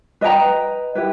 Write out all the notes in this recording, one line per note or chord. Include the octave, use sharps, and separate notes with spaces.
B4 D#5 G5 A#5
E4 G4 B4